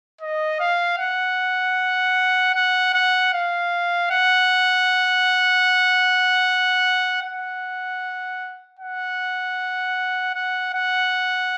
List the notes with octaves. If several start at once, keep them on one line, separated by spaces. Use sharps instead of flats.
D#5
F5
F#5
F#5
F#5
F5
F#5
F#5
F#5
F#5
F#5